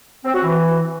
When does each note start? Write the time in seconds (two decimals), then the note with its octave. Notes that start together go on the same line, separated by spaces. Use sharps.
0.25 C4
0.34 F#4
0.44 E3